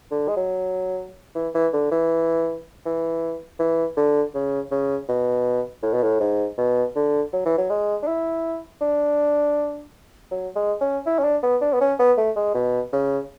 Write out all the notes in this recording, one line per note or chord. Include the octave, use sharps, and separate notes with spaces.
D3
G#3
F#3
E3
E3
D3
E3
E3
E3
D3
C#3
C#3
B2
A2
B2
A2
G#2
B2
D3
F#3
E3
F#3
G#3
D4
E4
D4
F#3
G#3
C#4
E4
C#4
D4
B3
D4
B3
C#4
B3
A3
G#3
B2
C#3